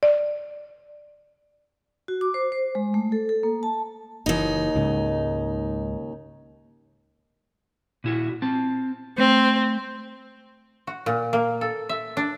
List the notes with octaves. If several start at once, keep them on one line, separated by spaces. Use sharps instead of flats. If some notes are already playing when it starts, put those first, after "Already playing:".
D5
F#4
D6
C5
C5
G#3
A3
A4
A4
A#3
A5
F#1 D#2 A#2 E3 D#4
C#2 G#2 C#3
A#2 E4 F#4
C4 A5
A3 C4
F#4
A#2
A#3
A4
E5
D4